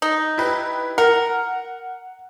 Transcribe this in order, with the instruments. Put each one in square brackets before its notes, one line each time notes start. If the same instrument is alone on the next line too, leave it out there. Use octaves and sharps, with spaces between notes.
[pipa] D#4
[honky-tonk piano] E4 G4 B4
[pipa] A#4 [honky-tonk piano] F#5